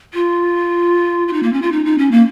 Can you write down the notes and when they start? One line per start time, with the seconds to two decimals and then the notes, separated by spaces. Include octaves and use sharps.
0.14 F4
1.28 F4
1.33 D#4
1.43 A#3
1.53 C#4
1.62 F4
1.72 D#4
1.85 D#4
1.98 C#4
2.11 A#3